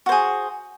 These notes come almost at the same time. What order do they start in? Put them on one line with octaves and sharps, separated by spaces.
F#4 C5 G#4